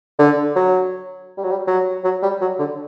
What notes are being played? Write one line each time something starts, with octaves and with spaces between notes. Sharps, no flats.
D3
F#3
G3
F#3
G3
F#3
F#3
G3
F#3
D3